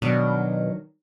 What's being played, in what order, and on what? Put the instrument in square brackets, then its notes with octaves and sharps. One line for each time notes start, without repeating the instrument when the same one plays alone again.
[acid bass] B2 [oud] D#3 F#3 D4